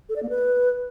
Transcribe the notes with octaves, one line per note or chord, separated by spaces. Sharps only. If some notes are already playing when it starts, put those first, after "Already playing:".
A4
D5
A#3
B4